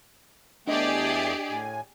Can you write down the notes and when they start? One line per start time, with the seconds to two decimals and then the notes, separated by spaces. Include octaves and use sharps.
0.67 E2 A3 D4 G4 G#4 D5 D#5
1.49 A2 G#5